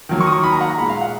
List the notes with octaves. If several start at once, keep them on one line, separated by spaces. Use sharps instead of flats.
D#3 F#3 A#3
C#6
D#6
C#6
B5
A#5
F#5
A#5
A#2 G#3 B5
F5
F#5